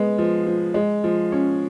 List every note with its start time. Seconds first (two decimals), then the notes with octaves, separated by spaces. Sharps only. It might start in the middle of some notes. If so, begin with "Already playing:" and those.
Already playing: G#3 B3
0.18 F3
0.47 F3
0.74 G#3
1.04 F3
1.32 C#4